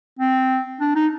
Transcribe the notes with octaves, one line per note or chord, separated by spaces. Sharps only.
C4
D4
D#4